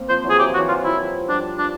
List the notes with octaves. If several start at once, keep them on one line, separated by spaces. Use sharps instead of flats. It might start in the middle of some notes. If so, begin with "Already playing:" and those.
Already playing: A#3 C4
F3 C5
E3 F#3
G#4
E3 F#3 G4
F3
F#4
E3 F#3
E3 F#3 F4
F3 G3 E4
F3 G3 D4
D4